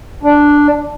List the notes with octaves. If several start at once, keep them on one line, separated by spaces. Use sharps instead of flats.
D4